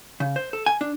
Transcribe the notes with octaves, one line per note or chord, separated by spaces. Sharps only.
C#3
C5
A4
G#5
D4